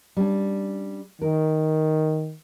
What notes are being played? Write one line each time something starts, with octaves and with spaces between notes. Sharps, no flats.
G3 C#4 D4
D#3 A#4